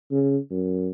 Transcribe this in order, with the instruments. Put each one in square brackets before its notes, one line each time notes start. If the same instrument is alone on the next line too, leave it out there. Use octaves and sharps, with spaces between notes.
[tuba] C#3
F#2